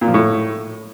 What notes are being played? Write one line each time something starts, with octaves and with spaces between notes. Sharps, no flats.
A#2
F3
A2